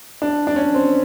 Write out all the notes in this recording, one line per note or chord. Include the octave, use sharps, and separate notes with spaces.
D4
D4
C#4
C4